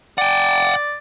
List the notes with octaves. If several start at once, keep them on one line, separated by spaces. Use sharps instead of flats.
D5 F#5 G5